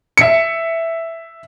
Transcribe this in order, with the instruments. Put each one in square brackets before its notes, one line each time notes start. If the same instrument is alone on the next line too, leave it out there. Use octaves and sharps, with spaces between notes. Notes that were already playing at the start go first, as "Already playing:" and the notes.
[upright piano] E5 C#7